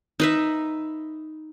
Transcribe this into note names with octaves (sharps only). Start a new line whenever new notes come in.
D#4 B4 E5